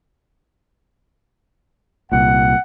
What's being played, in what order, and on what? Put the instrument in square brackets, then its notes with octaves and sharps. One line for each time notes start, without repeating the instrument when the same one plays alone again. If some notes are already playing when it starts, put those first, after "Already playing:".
[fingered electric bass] C2 A#2 [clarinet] F#5